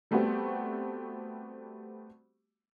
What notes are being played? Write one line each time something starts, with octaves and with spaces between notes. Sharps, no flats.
G3 A3 B3 C4 F#4 G4